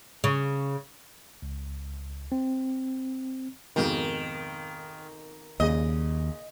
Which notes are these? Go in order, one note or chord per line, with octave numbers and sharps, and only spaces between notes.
C#3
C#2
C4
F2 G#2 B2 D#3
D#2 A#2 C#3 D#5